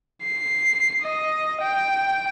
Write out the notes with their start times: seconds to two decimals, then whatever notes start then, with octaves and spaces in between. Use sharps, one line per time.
0.24 C7
1.02 D#5
1.61 G5